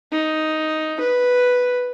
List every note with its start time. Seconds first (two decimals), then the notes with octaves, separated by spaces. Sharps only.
0.12 D#4
1.00 B4